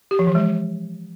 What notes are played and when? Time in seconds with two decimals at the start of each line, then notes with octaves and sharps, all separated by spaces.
0.11 G4
0.19 F3
0.27 E3
0.35 G#3